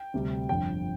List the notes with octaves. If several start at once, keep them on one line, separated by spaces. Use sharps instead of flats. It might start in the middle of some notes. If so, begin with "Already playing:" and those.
Already playing: G5
D2 C3 G3
G1 F2 D3 G5